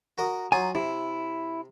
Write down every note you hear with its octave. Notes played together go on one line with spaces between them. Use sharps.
F#4 A#4 D#5
F#3 D#4 F4 G#5
C3 E4